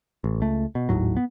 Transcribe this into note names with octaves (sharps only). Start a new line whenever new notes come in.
A1
C#2 A3
B2
G#1 D#2 A2 F#3
B3